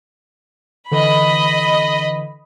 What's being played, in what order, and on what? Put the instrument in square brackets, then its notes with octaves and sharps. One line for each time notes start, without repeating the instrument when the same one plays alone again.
[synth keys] D3 E3 [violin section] D#5 B5